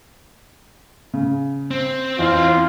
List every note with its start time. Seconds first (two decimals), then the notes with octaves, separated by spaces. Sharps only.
1.14 C#3
1.71 C4
2.19 E2 D#4 F4